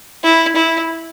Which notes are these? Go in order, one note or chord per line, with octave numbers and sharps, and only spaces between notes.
E4
E4